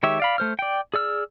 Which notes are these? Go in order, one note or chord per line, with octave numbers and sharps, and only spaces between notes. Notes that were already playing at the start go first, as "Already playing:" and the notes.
D#3 G#3 G4 C#5 E5
D5 F5 B5
A3 C5 F6
D5 G5
G#4 D5 E6 F6